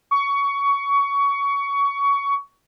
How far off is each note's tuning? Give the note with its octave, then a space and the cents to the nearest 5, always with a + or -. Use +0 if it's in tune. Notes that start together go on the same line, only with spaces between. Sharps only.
C#6 +20